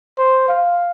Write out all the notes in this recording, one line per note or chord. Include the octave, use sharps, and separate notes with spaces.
C5
F5